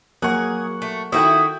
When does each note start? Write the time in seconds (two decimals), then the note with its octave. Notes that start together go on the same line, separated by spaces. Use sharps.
0.22 F#3 A#3 G#4 F#5 C#6
0.82 A3
1.12 D#3 E4 F#4 A4 E5 G5 D#6